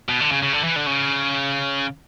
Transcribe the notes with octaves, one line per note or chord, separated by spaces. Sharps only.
B2
D3
C#3
C#3
D3
E3
D3
C#3